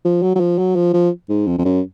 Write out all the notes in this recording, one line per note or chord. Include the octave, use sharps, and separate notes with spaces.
F3
F#3
F#3
F3
F#3
F3
F3
G#2
F2
F2
F#2